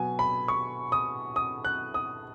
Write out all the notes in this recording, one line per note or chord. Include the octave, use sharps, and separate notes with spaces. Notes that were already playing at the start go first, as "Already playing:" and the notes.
Already playing: B2 F#3 B3 G#5
B5
C#6
D#6
D#6
F#6
D#6